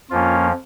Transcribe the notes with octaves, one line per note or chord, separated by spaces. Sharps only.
F2 F3 A#3 C#4 F4